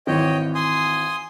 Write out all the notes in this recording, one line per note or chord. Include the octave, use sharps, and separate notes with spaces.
G#1 E3 C#5 D#5 G5
G#5 C6 D#6